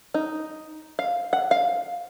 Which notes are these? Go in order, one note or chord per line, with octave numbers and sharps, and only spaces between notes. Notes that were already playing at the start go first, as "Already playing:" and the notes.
D#4
F5
F#5
F5